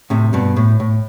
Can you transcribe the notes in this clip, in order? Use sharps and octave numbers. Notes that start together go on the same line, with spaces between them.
A2 C3
G2 B2
A2
A2